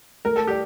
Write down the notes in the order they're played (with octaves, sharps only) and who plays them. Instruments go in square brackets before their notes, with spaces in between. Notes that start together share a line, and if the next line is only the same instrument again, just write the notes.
[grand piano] A3 [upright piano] A#4
[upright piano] A4
[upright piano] G4 [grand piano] D5